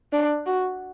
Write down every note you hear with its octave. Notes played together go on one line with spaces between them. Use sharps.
D4
F#4